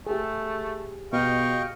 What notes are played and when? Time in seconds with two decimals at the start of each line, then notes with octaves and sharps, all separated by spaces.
0.07 A3 G4 G#4
1.13 B2 D#5 F5 G5 C#6